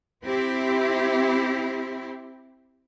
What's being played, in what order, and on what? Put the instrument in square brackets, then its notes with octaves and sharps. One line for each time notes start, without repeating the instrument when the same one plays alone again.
[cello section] C4 E4 G4